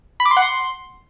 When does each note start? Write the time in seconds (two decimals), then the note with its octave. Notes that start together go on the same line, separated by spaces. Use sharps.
0.20 B5
0.25 D6
0.31 C6
0.37 F#5
0.42 C6